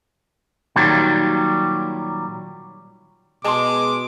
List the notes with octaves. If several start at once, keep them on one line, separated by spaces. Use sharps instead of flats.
A#2 D#3 F#3 G3
B2 G#3 A5 C6 D6